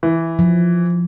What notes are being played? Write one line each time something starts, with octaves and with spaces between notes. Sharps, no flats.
E3
F3